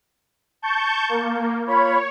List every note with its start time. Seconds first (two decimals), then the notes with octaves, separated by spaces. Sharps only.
0.62 A5 C#6 G6
1.09 A#3
1.67 F4 C#5 B5